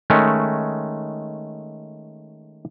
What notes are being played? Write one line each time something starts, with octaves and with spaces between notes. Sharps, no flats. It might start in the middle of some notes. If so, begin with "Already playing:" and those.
D#3 G#3 A3 C#4